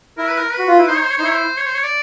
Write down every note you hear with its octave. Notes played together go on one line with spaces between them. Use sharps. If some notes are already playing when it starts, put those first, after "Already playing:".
E4 A#4
B4
A#4
B4
F#4
F4
E4
D#4 C5
C#5
C5
C#5
D#4 C5
E4 C#5
C5
C#5
C5
C#5
D5